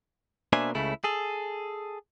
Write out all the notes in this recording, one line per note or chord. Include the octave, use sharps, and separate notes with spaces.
B2 A#3 D4 C5 E5 G#5
C#2 C#3 A3 E4
G#4 A4